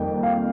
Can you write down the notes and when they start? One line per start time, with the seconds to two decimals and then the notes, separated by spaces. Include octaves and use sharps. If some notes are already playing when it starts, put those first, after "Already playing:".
Already playing: F2 D#3 G3 A#3 G5
0.23 F5